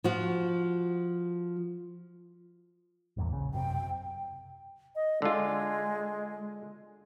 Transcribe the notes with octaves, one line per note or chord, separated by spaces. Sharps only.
F3 F#4
G1 E2 A#2
A#1 C#3
F#2 C3 G5
D#5
D3 G#3 F4